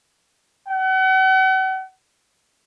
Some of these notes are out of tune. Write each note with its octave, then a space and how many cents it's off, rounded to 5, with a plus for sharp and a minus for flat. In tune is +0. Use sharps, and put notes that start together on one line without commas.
F#5 +40